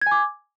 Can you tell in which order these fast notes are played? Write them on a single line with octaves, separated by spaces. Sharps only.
G#6 G#5 D6